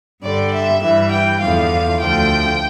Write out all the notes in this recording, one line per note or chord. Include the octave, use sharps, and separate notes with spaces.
G2 D3 G3 D5
E5
G2 E3 G3 E5
G5
E2 D3 F3 F5
D2 D3 F3 G5